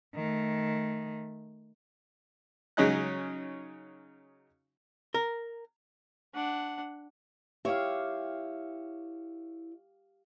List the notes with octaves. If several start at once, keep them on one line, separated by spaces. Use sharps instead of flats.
D#3 A3
C#3 F#3 C#4 D#4 D#5 F#6
A#4
D4 F#5
E4 G4 C#5 F5